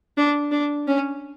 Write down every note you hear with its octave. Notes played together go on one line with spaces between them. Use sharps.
D4
D4
C#4